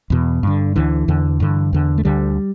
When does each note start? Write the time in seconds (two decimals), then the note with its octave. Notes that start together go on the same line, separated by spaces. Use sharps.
0.10 E2 B2
0.43 G2 D3
0.76 D2 D3 E3
1.08 E2 D3
1.40 G2 D3
1.73 E2 D3
1.98 A3
2.05 D2 D3 G3